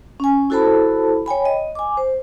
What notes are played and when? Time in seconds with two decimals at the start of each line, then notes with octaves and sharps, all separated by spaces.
0.20 C#4 G#5
0.50 E4 F#4 A4 C5 A5 B5
1.26 C#5 G5 G#5 B5
1.45 D#5
1.75 G#5 D6
1.97 C5